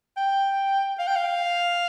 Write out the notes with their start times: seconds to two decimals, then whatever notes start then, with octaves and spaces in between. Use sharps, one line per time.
0.17 G5
0.99 F5
1.07 G5
1.16 F5